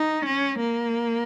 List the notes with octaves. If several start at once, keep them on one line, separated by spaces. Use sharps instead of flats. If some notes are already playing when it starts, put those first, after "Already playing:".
Already playing: D#4
C#4
A#3